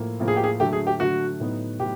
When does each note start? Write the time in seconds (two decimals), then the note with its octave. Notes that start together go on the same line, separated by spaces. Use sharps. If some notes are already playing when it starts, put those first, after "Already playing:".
Already playing: A2 F3 A#3
0.20 A2 F3 A#3
0.28 G#4
0.36 G4
0.44 G#4
0.60 D3 F#3 A3 G4
0.73 G#4
0.87 G4
1.00 D3 F#3 A3 F#4
1.40 A2 F#3 B3 D#4 F#4
1.80 A2 F#3 G4